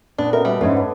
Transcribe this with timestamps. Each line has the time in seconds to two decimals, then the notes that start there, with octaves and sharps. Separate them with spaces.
0.18 A#2 B3 D4
0.33 B2 C#4 A4 A#4 E5 G5
0.45 G3 A3 B3 A4 E5
0.61 G#2 D3 A3 C#4 B4 E5 F#5
0.77 B3